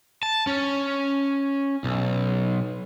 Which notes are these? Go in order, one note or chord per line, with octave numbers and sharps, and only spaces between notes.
A5
C#4
B1